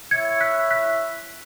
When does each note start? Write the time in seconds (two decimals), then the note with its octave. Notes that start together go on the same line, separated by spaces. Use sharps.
0.11 E4 C#5 E5 G#6 C#7
0.41 F#6 B6
0.71 F#6 B6